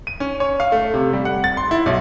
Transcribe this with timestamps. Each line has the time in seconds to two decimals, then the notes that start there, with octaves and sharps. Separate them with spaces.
0.07 D#7
0.20 C#4
0.40 C#5
0.60 F5
0.72 A3
0.94 C3
1.13 G3
1.25 F#5
1.44 A6
1.57 C6
1.71 E4
1.86 B1